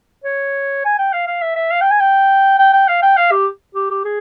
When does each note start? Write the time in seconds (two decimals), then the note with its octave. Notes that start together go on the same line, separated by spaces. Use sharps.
0.24 C#5
0.85 G#5
0.99 G5
1.13 F5
1.27 F5
1.41 E5
1.56 E5
1.71 F5
1.81 G5
1.91 G#5
2.00 G5
2.59 G5
2.73 G5
2.88 F5
3.02 G5
3.17 F5
3.31 G4
3.75 G4
3.90 G4
4.05 G#4